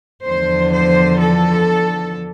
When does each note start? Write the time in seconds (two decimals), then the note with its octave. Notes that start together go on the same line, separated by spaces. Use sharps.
0.25 E2 D3 F3 C5
0.73 C5
1.20 A4